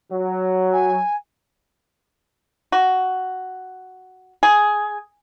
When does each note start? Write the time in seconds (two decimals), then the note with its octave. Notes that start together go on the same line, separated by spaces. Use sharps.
0.11 F#3
0.73 G#5
2.72 F#4
4.43 G#4